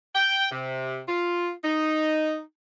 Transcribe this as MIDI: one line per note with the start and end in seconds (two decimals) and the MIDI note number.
0.15 0.47 79
0.52 1.01 48
1.09 1.51 65
1.64 2.40 63